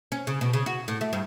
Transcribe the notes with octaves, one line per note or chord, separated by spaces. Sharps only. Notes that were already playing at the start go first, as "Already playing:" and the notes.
C#4
C#3
B2
C#3
F#4
A2
A3
G2